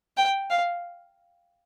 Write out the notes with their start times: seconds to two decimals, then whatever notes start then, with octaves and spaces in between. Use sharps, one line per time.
0.17 G5
0.50 F5